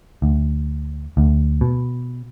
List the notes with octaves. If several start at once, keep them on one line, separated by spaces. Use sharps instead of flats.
D2
D2
B2